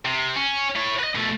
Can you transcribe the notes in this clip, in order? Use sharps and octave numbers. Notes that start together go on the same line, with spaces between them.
C3
C#4
E4 C#5
B4 D#5
B2 A3